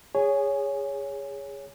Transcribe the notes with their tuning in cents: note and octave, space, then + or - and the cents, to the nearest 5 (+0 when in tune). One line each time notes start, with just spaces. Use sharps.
G#4 -20 C#5 +10 G#5 +0